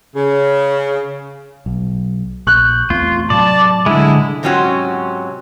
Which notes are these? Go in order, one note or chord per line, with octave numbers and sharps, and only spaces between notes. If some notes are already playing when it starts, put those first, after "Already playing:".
C#3
B1
A#1 C#6 F#6 G6
E2 A3 C4 F4
A2 C3 F#3 D5 A5
D3 G#3 E4
G#2 C3 F#3 C#4 F4 F#4